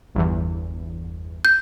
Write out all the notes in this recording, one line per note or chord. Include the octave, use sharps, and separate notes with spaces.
G1 E2
G6